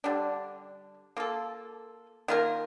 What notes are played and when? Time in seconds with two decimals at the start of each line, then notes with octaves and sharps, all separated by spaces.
0.04 D3 G3 D4
1.17 A#3 F4 A4
2.28 D#3 A#3 F4 A#4